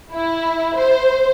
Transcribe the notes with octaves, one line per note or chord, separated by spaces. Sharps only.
E4
C5